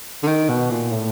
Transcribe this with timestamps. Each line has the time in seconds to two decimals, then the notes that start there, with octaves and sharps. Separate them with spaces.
0.23 D3
0.28 D#3
0.49 B2
0.70 A#2
0.92 A2